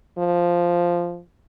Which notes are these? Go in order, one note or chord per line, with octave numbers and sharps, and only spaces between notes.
F3